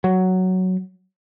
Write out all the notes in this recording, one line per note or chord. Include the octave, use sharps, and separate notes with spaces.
F#3